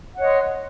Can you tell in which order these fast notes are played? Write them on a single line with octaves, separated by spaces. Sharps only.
F#5 C#5 D#5 C6